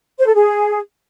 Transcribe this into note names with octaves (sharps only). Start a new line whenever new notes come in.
C5
A4
G#4